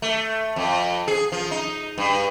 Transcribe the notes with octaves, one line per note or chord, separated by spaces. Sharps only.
A3
F2
G#4
F3
D#4
G2